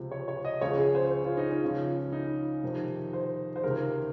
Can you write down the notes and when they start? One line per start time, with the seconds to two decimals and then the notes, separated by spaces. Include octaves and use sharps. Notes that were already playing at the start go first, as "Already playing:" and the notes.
Already playing: C#2 C3 F3
0.11 C#5
0.28 C#5
0.45 D#5
0.61 C#2 C#3 F3 C#5
0.78 G#4
0.95 C5
1.12 C5
1.24 F4
1.37 D#4
1.50 C#4
1.62 C#2 C#3 F3
2.12 D#4
2.63 F2 C3 D#3
3.13 C5
3.56 C5
3.64 C#2 C3 D#3 A#4